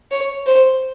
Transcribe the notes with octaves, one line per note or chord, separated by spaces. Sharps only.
C#5
C5